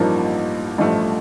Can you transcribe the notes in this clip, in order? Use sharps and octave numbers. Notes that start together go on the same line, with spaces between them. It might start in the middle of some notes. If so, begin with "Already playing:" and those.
Already playing: A1 G2 F3 A#3 D#4
A1 G2 F3 A3